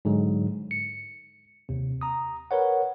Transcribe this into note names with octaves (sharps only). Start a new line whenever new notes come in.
G#2 D3 F#3 G#3
C#7
D#2 C3
A#5 D#6
A#4 B4 C#5 F#5